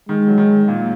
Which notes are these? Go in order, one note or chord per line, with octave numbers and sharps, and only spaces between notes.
D#3 G#3
F#3
D#3
A#2